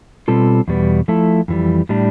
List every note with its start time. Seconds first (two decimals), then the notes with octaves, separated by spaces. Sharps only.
0.28 B2 G3 C4 F4 A4
0.68 E2 B2 G3 B3
1.08 F3 A3 E4 A4
1.48 F2 E3 G3
1.89 A2 G3 D4